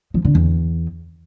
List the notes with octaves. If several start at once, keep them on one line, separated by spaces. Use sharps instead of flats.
F3
D3
E2